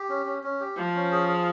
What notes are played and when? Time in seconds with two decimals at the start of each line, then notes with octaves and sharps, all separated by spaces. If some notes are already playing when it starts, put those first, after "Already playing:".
Already playing: G4
0.09 C#4
0.26 C#4
0.43 C#4
0.60 G4
0.77 F3 C5
0.95 C#4
1.12 G#4
1.29 G#4